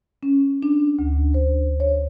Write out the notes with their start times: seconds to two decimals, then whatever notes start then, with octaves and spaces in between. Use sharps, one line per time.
0.23 C#4
0.63 D4
0.99 D2
1.34 C5
1.80 C#5